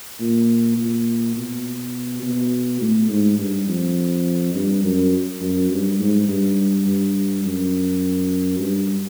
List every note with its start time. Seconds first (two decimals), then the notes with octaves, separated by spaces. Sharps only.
0.20 A#2
0.78 A#2
1.36 B2
2.23 B2
2.81 A2
3.10 G#2
3.38 G2
3.68 F2
4.55 G2
4.84 F#2
5.41 F#2
5.70 G2
5.99 G#2
6.28 G2
6.87 G2
7.44 F#2
8.60 G2